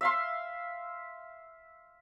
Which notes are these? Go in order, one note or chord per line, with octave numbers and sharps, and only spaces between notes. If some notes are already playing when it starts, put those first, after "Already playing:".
E5 F5 C6